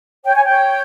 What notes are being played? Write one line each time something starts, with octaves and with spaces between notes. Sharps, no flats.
C#5 G5
G#5
C#5 G5